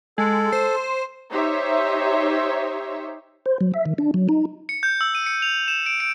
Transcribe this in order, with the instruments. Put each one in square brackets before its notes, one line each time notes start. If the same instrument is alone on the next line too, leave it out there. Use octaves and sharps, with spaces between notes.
[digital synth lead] G#3 [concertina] A4
[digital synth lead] C5
[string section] D#4 G4 C5 C#5 E5
[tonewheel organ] C5
F#3
E5
D#3
D4
F#3
D#4
[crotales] C#7
G6
E6
D#7
C#7
F7
E7
D7
D7